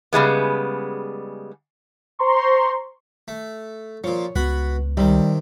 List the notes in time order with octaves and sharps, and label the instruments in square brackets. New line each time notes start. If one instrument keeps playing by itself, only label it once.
[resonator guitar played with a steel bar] C#3 G3 G#3 B3
[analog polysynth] C5 A#5 C6 C#6
[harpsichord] A3
[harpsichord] A#2 F3 [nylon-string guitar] C#5
[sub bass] C#2 [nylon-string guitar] B3 [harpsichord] F#4 F#5 B5
[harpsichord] C3 D#3 [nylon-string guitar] G3